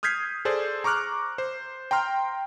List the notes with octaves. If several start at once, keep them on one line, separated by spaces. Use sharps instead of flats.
D#6 F6 G6 G#6 B6 C7
G#4 A4 C5 D5
A#5 C#6 D6 F6 F#6
C5
G5 A#5 C6 F6